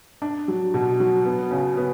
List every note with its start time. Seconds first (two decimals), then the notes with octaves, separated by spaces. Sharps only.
0.22 D4
0.48 F#3
0.74 B2
1.00 F#3
1.25 B3
1.51 C#3
1.77 B3